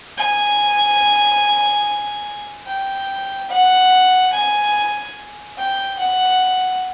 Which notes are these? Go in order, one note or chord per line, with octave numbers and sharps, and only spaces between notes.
G#5
G5
F#5
G#5
G5
F#5